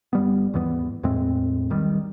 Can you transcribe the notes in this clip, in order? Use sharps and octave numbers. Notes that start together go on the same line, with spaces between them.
G1 G3 B3
D#2 G#2 E3 B3
E2 A2 G#3 C4
B1 D#3 G3